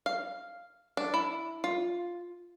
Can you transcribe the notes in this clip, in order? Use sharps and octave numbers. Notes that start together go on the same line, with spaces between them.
F5
D4
E4
F4